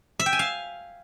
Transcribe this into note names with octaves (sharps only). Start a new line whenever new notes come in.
E5
G5
G#5
F5